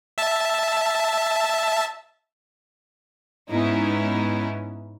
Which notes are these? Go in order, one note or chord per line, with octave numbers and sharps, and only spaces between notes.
E5 A5
G#2 B3 C#4 D#4 E4